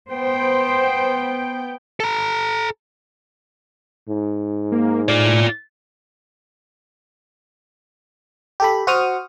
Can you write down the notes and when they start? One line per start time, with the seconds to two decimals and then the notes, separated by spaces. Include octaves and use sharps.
0.11 B3 C5 G5
2.00 A4 A#5
4.09 G#2
4.72 A#3
5.09 A2 F4 D5
8.60 G4 A4 B5
8.87 F#4 C5 C#6 D#6 F6